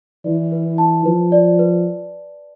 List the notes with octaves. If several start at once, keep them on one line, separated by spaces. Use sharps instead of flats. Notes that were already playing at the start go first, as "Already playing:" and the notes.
E3 D5
B4
A5
F3 B4
D5
B4